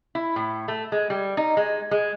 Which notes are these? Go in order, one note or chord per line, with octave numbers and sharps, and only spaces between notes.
E4
A2
A3
G#3
G3
D#4
G#3
G#3